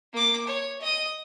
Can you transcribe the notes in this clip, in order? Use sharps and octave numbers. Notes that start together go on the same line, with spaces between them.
A#3 D6
C#5
D#5 D#6